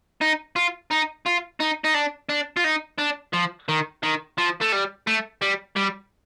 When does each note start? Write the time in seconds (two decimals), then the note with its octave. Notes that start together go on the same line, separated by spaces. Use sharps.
0.21 D#4
0.56 F4
0.91 D#4
1.26 F4
1.60 D#4
1.85 D#4
1.95 D4
2.29 D4
2.57 F4
2.64 D#4
2.99 D4
3.33 F3
3.69 D#3
4.03 D#3
4.38 F3
4.61 A3
4.72 G3
5.07 A3
5.42 G3
5.76 G3